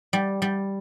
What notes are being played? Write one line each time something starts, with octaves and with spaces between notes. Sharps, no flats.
G3
G3